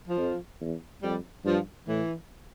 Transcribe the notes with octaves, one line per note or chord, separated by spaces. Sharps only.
F3
F2
E2
F2 G3
G2 F3
A2 E3